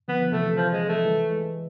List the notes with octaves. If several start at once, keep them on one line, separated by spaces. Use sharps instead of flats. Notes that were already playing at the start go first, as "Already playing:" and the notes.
D3 F3 B3
D3 F3
C3 E3 A3
C3 E3
F3
G#3
A3
E3 G#3
E3 G#3